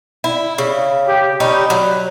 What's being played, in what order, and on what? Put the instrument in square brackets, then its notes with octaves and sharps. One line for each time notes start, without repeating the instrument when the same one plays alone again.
[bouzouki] E4
C#3
[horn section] G4
[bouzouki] C#4 D#4 G4 [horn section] B5
[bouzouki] F#3